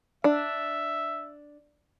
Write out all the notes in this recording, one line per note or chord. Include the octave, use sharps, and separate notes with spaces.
D4 E5